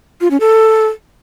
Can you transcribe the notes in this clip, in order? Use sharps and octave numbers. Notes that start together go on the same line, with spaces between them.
F4
C#4
A4